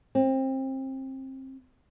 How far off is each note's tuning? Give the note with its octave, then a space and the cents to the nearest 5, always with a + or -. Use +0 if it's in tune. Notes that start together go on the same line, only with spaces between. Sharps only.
C4 +25